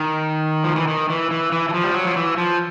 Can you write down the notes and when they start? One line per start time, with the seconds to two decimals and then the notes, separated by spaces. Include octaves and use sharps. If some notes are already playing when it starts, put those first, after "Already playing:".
Already playing: D#3
0.64 F3
0.76 E3
0.88 D#3
1.10 E3
1.31 E3
1.52 E3
1.69 E3
1.74 F3
1.84 G3
1.94 F#3
2.05 F3
2.16 E3
2.37 F3